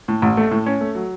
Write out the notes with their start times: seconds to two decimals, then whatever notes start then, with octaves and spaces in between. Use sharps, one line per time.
0.08 A2
0.22 A1
0.37 A3
0.51 A2
0.66 C#4
0.81 A3
0.95 F#3